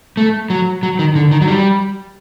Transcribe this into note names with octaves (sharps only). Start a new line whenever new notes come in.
A3
F#3
F#3
D#3
D3
D#3
F#3
G3